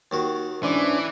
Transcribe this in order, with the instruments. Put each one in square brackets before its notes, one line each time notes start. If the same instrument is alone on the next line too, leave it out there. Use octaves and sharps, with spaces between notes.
[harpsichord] D#2 D#3 F#4
[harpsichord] G#2 [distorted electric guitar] E3 [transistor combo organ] C#4 D4 D5